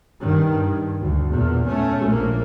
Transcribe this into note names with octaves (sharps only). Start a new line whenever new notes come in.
G2 D#3
G2
D2
E2 A#2
A3 C#4
A#1 A#3